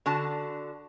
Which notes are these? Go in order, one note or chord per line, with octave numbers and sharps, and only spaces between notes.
D3 F#4 A5